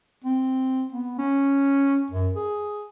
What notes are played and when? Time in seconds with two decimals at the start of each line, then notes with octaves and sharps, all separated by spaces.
0.24 C4
0.92 B3
1.18 C#4
2.11 F#2
2.36 G#4